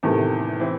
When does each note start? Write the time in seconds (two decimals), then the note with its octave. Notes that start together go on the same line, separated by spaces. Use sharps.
0.03 E2 A2 C3 D#3 A3
0.60 E3 C4 E4